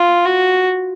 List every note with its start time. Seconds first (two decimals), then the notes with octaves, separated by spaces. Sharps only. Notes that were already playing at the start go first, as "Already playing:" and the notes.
Already playing: F4
0.25 F#4